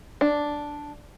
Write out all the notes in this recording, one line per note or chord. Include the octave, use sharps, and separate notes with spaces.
D4